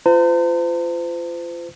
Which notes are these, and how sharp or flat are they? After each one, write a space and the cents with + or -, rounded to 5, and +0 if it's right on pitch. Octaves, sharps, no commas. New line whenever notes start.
F4 -25 C5 -40 A#5 -45